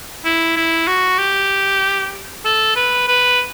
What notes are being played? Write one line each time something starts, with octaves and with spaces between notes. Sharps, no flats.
E4
E4
F#4
G4
A4
B4
B4